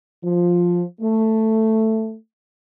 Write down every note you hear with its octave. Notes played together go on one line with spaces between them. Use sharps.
F3
A3